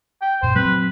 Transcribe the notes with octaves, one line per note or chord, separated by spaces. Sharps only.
G5
F#2 A#2 C5
F#3 C4 B4